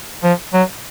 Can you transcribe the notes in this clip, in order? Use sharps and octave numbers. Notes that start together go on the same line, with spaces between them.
F3
F#3